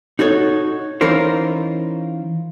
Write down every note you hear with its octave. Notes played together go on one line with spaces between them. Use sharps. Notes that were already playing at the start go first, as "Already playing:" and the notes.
D#4 F#4 A4 C#5
E3 C#4 D#4 F4 A#4 C5